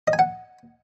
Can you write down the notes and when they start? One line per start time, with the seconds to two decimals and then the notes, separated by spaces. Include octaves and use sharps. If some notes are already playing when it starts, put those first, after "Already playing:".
0.08 D#5
0.13 G#5
0.19 F#5